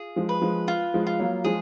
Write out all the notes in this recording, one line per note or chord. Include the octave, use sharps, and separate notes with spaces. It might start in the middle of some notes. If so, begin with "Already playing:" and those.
Already playing: F4 G#4
F3 G#3
B4
F3 G#3
F4
F3 G#3
F4
F#3 A#3
F3 G#3 G#4